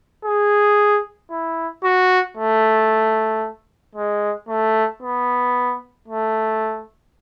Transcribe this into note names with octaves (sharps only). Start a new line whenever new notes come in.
G#4
E4
F#4
A3
G#3
A3
B3
A3